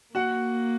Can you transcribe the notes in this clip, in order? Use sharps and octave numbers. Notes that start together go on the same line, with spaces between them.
A#3 F#4 F#5